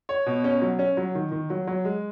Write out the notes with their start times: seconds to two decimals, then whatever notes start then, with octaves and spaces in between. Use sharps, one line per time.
0.09 C#5
0.26 B2
0.44 C#4
0.62 F#3
0.79 C#4
0.97 F#3
1.15 D#3
1.32 D#3
1.50 F#3
1.67 F#3
1.85 G#3